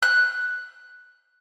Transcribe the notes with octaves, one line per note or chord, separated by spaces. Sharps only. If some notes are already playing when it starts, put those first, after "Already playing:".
F#6